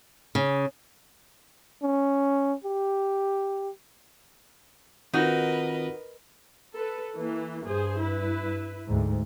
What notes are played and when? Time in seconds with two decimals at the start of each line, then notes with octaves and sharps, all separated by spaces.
0.35 C#3
1.82 C#4
2.64 G4
5.14 D#3 C4 D#4 F4 F#4 A#4 B4 D#5
6.74 A4 B4
7.16 E3 A#3
7.64 G2 G#4 C5
8.00 E4 B4
8.88 D2 G#2